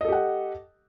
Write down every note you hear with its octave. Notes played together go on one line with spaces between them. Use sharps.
G4 A4 D#5 F#5